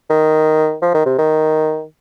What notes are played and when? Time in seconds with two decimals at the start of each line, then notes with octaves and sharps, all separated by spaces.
0.10 D#3
0.82 F3
0.94 D#3
1.06 C3
1.18 D#3